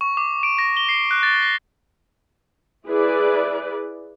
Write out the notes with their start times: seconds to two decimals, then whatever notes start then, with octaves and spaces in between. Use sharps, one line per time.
0.01 C#6
0.17 D6
0.43 D7
0.58 A#6
0.77 G7
0.89 C7
1.11 F#6
1.23 A6
1.42 A#6
2.87 E4 G#4 B4 D5